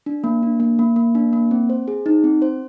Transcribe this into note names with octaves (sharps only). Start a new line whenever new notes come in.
D4
A#3
D4
A#3
A#3
A#3
D4
A#3
C4
C5
G#4
D#4
C4
C5